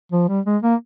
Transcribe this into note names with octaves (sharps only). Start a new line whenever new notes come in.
F3
G3
G#3
A#3